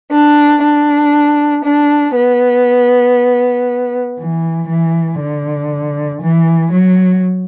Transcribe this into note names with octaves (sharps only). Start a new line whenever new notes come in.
D4
D4
D4
B3
E3
E3
D3
E3
F#3